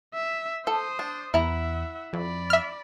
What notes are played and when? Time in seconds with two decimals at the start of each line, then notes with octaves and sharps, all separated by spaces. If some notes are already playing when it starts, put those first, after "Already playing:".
0.14 E5
0.67 A4 C5 D#6
0.99 D4
1.34 E2 E4 E5 F#5 A#5
2.13 F2 D5 B5
2.50 E5 F6